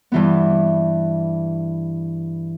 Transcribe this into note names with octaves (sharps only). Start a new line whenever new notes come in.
G2 E3 B3